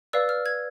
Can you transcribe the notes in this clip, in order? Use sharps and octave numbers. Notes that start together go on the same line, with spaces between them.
B4 D5 F5 E6
F6
G#6